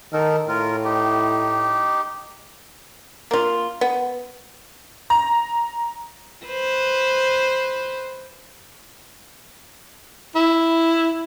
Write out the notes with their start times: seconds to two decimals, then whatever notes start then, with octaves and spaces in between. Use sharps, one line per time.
0.13 D#3 D#4 A4 A#4
0.48 A2 F4 A#4
0.85 D#4 G4
3.31 A#3 F4
3.81 B3
5.10 A#5
6.45 B4 C5
10.35 E4